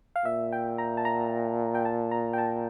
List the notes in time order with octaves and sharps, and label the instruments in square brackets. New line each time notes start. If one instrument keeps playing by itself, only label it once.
[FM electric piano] F5
[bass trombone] A#2 [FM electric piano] E5
[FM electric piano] G5
A#5
A5
A#5
G5
A5
A#5
G5
A5